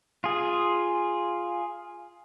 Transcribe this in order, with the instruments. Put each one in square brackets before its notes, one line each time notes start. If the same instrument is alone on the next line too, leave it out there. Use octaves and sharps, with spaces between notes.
[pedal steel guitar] F4 G#4